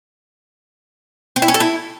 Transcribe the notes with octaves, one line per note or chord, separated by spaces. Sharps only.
C4
E4
C#4
A4
E4